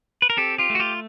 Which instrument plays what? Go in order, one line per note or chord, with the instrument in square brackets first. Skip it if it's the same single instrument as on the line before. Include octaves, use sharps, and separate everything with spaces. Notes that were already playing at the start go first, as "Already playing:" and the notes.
[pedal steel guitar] B4
A#4
C4 G4 A4
F4 G4
A3
F#4
F4 G4